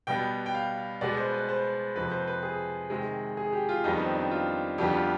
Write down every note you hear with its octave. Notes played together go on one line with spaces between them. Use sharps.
B2 G3 B3 G5
G5
F5
B2 G#3 B3 D5
C5
B4
C5
F2 C3 F3 B4
C5
B4
G#4
C3 D#3 G#3
G#4
G4
F4
F2 D#3 G3 B3 D#4
C4
D4
F4
F2 D3 G3 B3 G4
F4